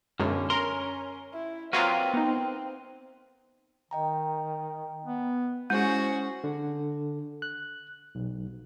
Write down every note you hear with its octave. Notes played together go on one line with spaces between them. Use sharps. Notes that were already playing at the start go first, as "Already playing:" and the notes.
B1 F#2 D3 G#3 C#4 F6
C#4 A#4 C6
E4
F#3 A#3 C4 F4 A#4 B4 F5
B3 D#4
D#3 D#5 G5 A#5
B3
G#3 C#4 E4 F#4 G#4 C5 F#5
D3
F#6
B1